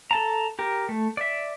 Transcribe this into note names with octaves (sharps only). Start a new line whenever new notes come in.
A4 A5 A#5
G4 A#4
A3
D5 E5